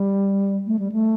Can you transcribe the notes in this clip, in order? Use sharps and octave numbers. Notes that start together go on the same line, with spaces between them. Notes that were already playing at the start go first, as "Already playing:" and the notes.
Already playing: G3
A3
G3
A3